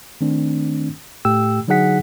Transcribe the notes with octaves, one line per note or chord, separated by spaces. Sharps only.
D#3 A3 C4 D4
A2 A3 G4 G5 E6
D3 F#3 D#4 G#4 F#5 B6